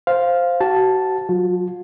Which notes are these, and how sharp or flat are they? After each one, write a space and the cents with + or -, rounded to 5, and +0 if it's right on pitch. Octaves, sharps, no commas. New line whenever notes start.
C5 +0 F5 +0
F#4 +35 A5 +0
F#3 -15 F4 +40